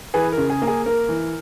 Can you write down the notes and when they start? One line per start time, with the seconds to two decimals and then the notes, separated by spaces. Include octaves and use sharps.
0.14 E3 G#4 B4
0.32 A#4
0.38 C#3
0.50 G#4
0.62 A#3
0.67 G#4
0.86 A#3 A#4
1.09 E3